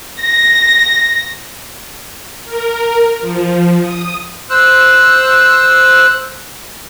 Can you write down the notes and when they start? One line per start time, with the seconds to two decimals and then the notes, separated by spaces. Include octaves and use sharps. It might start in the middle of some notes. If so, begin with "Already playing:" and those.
0.21 A#6
2.45 A#4
3.20 F3
3.81 D#6
4.50 C5 E6 F#6